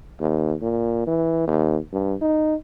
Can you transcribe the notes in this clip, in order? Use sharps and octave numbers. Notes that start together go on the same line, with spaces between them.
D#2
A#2
E3
D#2
G2
D#4